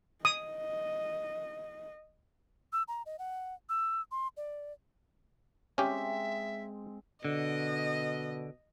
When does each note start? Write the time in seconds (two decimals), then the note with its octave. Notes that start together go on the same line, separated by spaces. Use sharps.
0.25 D#5 D#6
2.73 E6
2.88 A#5
3.06 D#5
3.19 F#5
3.69 E6
4.12 C6
4.37 D5
5.78 G#3 C4 C#4 G4 E5
7.25 B2 D3 D#5